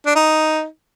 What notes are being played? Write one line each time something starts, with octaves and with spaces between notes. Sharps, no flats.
D4
D#4